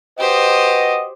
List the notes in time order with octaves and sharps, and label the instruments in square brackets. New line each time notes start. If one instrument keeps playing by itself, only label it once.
[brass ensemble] F#4 B4 D#5 [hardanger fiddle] G4 C5